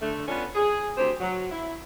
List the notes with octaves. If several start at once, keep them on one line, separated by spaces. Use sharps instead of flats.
D3 A3
B3 C#4 D4 F4 A4
G#4
D2 C4 G4 C5
F#3
E4